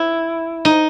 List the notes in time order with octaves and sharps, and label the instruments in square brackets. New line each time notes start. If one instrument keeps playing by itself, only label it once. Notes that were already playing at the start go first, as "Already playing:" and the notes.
Already playing: [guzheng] E4
D#4